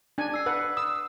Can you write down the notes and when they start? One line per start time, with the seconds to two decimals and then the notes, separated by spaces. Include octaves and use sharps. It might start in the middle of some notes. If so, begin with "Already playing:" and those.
0.18 D4 G#5
0.34 E6 C7
0.46 B4 F#5
0.77 D#6 E6